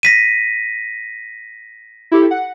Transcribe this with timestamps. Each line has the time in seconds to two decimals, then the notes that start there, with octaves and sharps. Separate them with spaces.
0.03 A#6 B6 D#7
2.12 E4 G4 A4
2.31 F#5